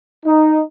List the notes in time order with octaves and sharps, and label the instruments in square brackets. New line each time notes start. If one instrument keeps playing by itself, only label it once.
[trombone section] D#4